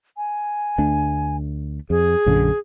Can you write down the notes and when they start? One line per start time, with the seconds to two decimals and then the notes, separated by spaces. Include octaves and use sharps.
0.17 G#5
0.78 D2 A3 D4
1.90 F2 G#4
2.26 A#1 F#2 D3